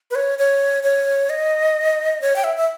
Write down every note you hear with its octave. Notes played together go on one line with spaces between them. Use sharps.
B4
C#5
C#5
C#5
D#5
C#5
G5
E5
E5